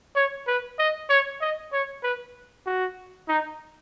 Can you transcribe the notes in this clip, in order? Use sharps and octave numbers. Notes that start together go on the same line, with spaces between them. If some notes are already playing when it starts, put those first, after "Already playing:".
C#5
B4
D#5
C#5
D#5
C#5
B4
F#4
D#4